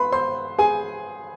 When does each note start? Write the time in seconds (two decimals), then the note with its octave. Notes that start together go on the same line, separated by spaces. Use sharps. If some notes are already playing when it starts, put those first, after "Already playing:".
Already playing: B4 B5 C6
0.12 C5 C6
0.58 G#4 G#5